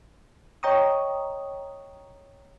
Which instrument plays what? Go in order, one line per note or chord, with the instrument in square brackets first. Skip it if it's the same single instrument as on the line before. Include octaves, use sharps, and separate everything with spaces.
[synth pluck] C#5 D#5 G5 A#5 C#6 D#6